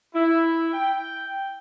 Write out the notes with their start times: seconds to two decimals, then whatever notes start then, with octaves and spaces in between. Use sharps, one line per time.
0.14 E4
0.73 G5